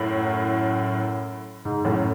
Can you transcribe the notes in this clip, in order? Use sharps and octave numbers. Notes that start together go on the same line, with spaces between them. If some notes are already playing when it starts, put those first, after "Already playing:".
Already playing: F#2 A2
G#2
F#2 A2